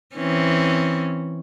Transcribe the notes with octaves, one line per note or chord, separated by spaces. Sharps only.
E3 C4 C#4